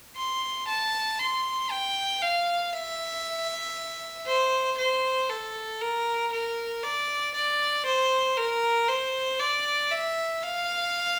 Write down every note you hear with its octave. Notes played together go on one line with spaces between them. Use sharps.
C6
A5
C6
G5
F5
E5
C5
C5
A4
A#4
A#4
D5
D5
C5
A#4
C5
D5
E5
F5